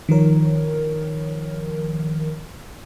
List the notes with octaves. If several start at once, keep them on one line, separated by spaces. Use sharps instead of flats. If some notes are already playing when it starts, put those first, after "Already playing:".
D#3 F3 A#4 C#5